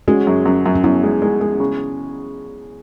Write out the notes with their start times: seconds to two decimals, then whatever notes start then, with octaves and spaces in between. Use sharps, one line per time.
0.08 G#3 C#4 F#4
0.27 F#2
0.45 F#2
0.66 F#2
0.75 C#4
0.84 F#2 B3 E4
1.03 G#3
1.22 G#3
1.41 G#3
1.60 C#3